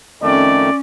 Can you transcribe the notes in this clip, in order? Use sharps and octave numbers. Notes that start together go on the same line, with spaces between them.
F2 D#3 A3 C#4 D5